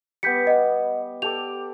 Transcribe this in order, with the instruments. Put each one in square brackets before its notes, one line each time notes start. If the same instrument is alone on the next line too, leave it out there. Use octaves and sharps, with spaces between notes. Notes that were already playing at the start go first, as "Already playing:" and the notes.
[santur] G3 B3 [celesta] G6 B6 C#7
[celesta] D#5 F#5
[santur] G4 A4 D5 [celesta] F7